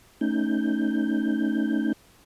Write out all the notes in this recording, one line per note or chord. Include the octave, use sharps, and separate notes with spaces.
A3 C#4 D#4 G6